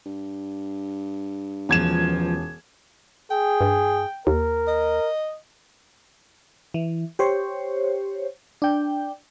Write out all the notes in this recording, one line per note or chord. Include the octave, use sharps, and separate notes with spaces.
G2
E1 C#2 F3 B3 G#6 E7
G#4 G5
G2
D#2 A#4
D#5
E3
G4 C5 C#5
D4 G5